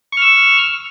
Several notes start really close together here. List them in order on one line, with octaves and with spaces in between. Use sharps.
C#6 F6 E6